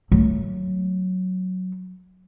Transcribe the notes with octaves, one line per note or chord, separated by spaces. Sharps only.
F#3 A3